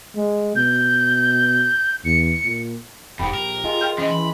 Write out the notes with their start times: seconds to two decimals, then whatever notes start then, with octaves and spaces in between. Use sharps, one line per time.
0.16 G#3
0.56 B2 G6
2.05 E2 C#7
2.44 A#2
3.19 E1 F2 G#2 G4 B5
3.34 A#1 A#4
3.64 G#3 F4
3.81 G5 C6 F6 G6
3.98 E3 F3 C#4 D#5
4.10 E3 B5